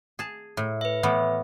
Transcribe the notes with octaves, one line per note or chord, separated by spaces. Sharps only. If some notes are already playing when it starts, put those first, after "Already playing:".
G#4 A5
A2
B4 E5
A2 E3 B3